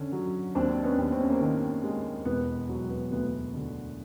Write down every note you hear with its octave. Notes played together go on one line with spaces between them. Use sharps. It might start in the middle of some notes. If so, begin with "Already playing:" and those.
Already playing: D3 C#4
F#3
D#2 C4 D4
B3 C#4
D#2
C4
C#4
A#3 C4
D#3
G#3
E1 B3
F#3
B3
D2 B3
D3